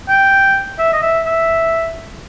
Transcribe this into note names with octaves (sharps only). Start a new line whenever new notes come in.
G5
E5
D#5
E5
E5